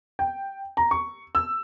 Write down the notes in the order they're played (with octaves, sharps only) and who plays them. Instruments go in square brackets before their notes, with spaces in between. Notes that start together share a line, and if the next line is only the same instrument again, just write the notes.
[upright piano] G5
A#5
C#6
E6